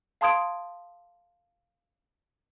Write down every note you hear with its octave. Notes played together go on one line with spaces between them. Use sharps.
F5 A5 C6 D#6 G#6 D7